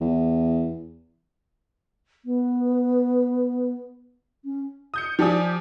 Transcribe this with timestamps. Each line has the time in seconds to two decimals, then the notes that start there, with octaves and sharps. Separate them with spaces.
0.01 E2
2.25 B3
4.45 C#4
4.94 D#6 G6 C#7
5.19 F3 G4 D5 G#5 D#6